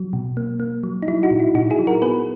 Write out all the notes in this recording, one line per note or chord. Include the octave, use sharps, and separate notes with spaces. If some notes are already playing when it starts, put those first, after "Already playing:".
Already playing: F#3
B2
A#3
A#3
F#3
D#4
F#3 E4
D#4 F#4
A#2
E4
A#2 D#4 F#4
E4 G#4
F#3
F#4 A#4
B3 G#4 B4